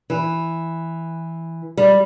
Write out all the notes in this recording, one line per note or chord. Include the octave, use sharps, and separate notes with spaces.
E3
G3